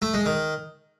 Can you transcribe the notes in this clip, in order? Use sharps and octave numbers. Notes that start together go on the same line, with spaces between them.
A3
G#3
D#3